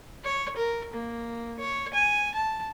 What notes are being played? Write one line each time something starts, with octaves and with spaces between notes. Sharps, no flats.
C#5
A#4
A#3
C#5
G#5
A5